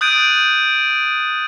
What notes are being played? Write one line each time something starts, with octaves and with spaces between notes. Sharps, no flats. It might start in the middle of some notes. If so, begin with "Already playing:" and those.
D#6 F#6 G6 A6 D7 D#7